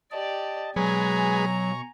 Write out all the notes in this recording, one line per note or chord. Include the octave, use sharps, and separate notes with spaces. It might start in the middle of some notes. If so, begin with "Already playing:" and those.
G4 D5 D#5 A5
B2 F#3 G#3 G#4 B4 G#5 A#5 C#6